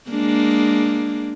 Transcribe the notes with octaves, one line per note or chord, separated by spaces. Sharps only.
G#3 A#3 D4